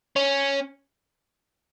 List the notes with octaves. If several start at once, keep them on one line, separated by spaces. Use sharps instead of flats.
C#4